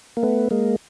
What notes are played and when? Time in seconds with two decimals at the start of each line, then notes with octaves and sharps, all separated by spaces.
0.17 A#3
0.23 A3 B3
0.51 G#3 A#3